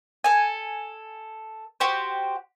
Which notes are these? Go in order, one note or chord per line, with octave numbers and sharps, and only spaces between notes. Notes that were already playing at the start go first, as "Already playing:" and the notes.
A4 G#5
F#4 G4 C5